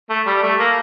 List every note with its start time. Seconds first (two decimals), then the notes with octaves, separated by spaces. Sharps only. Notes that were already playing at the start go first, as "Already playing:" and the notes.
0.10 A3
0.27 G3
0.43 A3
0.59 A#3